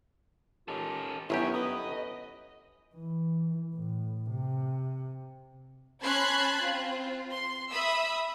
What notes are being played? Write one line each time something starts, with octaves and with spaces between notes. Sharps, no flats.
D#3 C#4 F4 G4 A4
G1 F#2 D#3 B3 E4 G4 C#5
B4 D#5
E3
A2
C3
C#4 A5 B5 C6 F#6 G#6
C4 F4
C6
E5 B5 D#6 E6